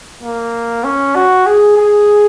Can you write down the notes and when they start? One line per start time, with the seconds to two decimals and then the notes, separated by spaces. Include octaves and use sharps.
0.23 A#3
0.84 C#4
1.15 F#4
1.46 G#4
1.77 G#4